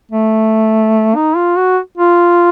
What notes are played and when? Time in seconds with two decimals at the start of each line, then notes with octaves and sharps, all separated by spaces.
0.12 A3
1.16 D#4
1.36 F4
1.57 F#4
1.98 F4